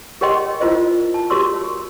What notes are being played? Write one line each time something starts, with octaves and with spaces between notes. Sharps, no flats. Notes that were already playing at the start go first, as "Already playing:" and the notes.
G4 A#4 C#5 D#5 G5 C6
E4 F4 A#4 C5 D#5
A5
F#4 G4 A#4 C#5 C6 E6